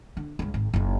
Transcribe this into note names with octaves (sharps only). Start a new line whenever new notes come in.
D3
C#2 G2
G#1
F#1 D#4